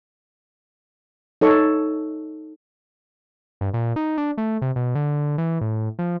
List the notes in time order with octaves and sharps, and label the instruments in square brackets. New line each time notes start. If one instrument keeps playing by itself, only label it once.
[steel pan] D#4 A4 C#5 C#6
[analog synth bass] G2
A#2
D#4
D4
A3
C3
B2
D3
E3
A2
F3